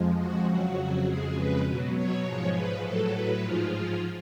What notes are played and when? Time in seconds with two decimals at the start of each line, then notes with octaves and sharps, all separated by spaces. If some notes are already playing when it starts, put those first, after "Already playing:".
Already playing: F2 F3 G#3
0.19 F#4
0.49 F2 C#3 F#3 F#4
1.08 F2 C#3 G#3 G#4
1.37 B4
1.67 B2 F#3
1.96 C#5
2.25 G#2 F3 G#3
2.55 B4
2.84 A2 F#3 A4
3.13 B4
3.42 G#2 F3 G#3 F4